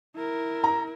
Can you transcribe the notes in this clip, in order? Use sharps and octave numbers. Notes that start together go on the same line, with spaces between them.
E4 A#4
A#5